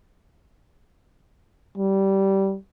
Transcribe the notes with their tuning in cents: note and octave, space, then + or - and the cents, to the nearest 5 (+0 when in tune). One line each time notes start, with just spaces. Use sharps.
G3 -15